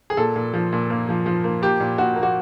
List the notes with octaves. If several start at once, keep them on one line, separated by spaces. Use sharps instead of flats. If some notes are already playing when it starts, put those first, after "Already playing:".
G#4
A#2 A4
A#2
F3
A#2
A#3
F3
F3
A#3
A#3 G4
A#2
A#2 F#4
A#3
F#4